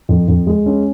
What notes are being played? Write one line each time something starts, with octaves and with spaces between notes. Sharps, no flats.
F2
F2
G#3
C#4